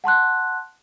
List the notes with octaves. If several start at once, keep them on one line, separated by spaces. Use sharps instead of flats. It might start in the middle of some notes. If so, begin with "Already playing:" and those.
F#5 A5 C6 F#6